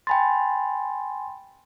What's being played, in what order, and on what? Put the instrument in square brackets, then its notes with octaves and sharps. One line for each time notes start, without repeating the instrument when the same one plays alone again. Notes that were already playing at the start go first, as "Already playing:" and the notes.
[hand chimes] G5 B5 A6 [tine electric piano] G#5 C6